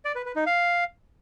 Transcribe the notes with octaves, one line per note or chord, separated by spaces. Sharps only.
D5
B4
B4
D#4
F5